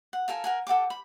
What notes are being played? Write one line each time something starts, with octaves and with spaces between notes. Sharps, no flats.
F#5
F4 A4 A#4 G#5
A#4 F#5 G#5
A4 F#5 G5 D6
B5